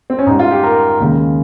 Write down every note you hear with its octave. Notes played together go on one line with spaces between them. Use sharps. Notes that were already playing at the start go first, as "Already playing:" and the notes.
C4
C#4
G#2 G3 D#4
F4
G4
A#4
D#2 C#3 G#3